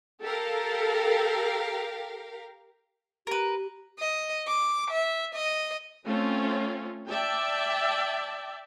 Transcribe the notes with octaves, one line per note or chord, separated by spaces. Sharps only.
G4 A4 A#4 F5
G4 A#4 B4
D#5
D6
E5
D#5
A3 C4 C#4 F4
D5 E5 G5 A5